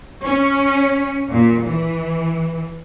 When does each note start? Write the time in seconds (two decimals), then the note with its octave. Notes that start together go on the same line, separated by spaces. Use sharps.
0.24 C#4
1.30 A#2
1.65 E3